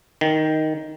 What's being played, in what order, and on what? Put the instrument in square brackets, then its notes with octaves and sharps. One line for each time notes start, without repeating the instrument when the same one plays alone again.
[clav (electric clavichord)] D#3